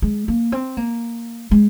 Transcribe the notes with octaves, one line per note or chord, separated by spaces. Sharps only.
G#3
A#3
C4
A#3
G#3